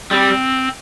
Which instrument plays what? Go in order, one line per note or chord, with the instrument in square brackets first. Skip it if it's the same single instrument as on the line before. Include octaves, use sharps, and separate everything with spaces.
[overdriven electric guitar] G3 [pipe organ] C4